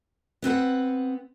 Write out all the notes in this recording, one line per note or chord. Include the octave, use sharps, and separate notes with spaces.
B3 C4 B4 F#5